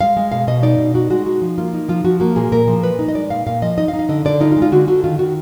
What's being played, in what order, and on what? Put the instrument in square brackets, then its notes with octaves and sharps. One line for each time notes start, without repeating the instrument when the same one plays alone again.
[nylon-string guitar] G#3 F5
G#3
B2 F5
B2 D#5
D#4 D5
B2
D#4 F#4
G#3 F#4
D#4 F#4
F3
A#3 F4
D#4
F3 F4
F3 F#4
A#3 F#4
A#2 G#4
A#2 A#4
F3
A#2 B4
D#4
D#5
G#3 D5
A#2 F5
A#2 F5
F3 D#5
D#4 D#5
F5
D#4
F5
D3 D#5
D3 D5
D#4 F4
F4
G#3
F4
D3 F#4
D3 F#4
D#3 F4
D#3 F#4